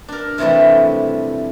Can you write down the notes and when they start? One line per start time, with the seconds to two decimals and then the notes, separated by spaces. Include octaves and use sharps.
0.08 D4 A#4
0.38 C3 E3 F3 G3 A3